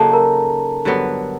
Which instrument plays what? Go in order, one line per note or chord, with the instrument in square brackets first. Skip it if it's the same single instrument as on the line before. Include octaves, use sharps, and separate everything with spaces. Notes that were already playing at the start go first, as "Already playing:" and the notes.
Already playing: [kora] C#3 F#3 A#3 D#4 [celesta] A4 A5
[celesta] A#4 A#5
[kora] G2 D3 F#3 B3